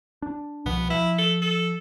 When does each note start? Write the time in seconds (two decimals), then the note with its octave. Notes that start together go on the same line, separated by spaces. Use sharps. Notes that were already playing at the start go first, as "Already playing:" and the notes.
0.22 D4
0.65 C2 B2 F3 B3
0.90 F3 E4
1.18 A4
1.42 A4